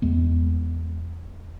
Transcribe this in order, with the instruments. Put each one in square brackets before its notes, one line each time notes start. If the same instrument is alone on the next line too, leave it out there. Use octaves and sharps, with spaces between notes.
[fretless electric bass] E2 G#3 B3